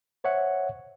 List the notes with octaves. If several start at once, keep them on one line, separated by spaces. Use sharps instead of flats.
C5 C#5 E5 F#5